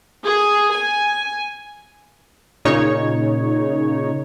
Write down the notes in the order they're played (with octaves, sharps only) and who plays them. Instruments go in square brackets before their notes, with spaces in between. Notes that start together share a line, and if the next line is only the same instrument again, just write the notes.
[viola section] G#4
G#5
[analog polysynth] A#2 C#3 D#4 C#5